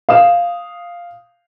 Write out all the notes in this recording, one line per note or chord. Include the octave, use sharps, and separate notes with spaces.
F5 D#6 E7